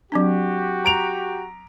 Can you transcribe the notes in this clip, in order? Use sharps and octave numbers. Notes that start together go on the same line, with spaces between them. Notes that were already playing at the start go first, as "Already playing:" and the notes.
F#3 C4 D4 F#4 G4
A#5 D7 F7